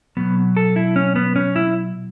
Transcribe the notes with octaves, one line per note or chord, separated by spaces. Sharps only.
B2 F#3 B3
A4
E4
C#4
B3
C#4
E4